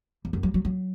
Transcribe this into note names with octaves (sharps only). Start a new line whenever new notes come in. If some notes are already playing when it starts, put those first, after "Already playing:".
E2
F#2
F#3
F#3
F#3